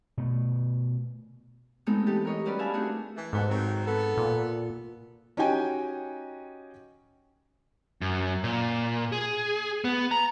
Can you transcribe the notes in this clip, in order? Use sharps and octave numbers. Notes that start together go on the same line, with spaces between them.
B2 A3
F#3 G#3 A3 B3 C4 D#4
E3 G4 A4
A#4 C#5 D#5
F#3 G3 C#4 F#4 B4 D5
G#4 E5 F5 G#5 A5 B5
A3 C4 D4 D#4 F#4 G#4
E3 A3
D#2 G#2 B3 A4
D#3 F#3 C4
B3 A4
A#2
C#4 D#4 F#4 G4 G5 G#5
F#2
A#2
G#4
B3
A#5